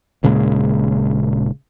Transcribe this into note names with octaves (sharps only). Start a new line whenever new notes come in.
D#1 A#2 C#3 G#3